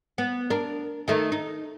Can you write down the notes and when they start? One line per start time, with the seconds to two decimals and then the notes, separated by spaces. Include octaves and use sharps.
0.18 B3
0.50 D4 A#4
1.08 D#3 A3 D#4
1.32 D#4